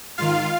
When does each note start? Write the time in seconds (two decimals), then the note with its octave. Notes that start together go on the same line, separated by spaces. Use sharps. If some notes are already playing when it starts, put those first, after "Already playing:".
0.18 G#2 D#3 F4 F5